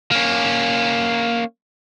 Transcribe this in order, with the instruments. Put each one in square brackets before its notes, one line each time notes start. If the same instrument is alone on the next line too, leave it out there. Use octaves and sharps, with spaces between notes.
[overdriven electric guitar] A#3 C#4